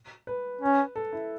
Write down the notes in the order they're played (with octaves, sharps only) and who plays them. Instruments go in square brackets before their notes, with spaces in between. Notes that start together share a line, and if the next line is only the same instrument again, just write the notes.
[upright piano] B4
[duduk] C#4
[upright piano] A4
E4